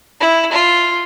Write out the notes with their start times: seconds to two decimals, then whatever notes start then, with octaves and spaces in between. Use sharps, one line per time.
0.20 E4
0.52 F4